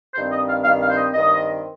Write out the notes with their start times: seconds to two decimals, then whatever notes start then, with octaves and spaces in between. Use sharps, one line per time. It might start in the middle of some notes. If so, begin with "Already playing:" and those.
0.15 G2 D#3 C4 C5
0.31 D#5
0.48 F5
0.65 G2 D#3 C4 F5
0.81 F5
0.91 C5
0.97 D#5
1.14 G2 D#3 C4 D#5